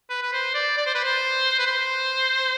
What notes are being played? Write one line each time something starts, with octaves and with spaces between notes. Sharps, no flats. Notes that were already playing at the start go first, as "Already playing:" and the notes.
B4
B4
C5
D5
D5
C5
B4
C5
B4
C5